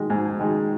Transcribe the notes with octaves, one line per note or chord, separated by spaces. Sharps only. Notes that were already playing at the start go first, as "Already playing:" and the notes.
Already playing: D#3 G#3
G#2
D#3 G#3